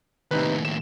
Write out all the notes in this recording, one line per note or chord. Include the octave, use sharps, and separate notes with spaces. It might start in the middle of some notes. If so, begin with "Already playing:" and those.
D#2 A2 C3 D#4 B4
E7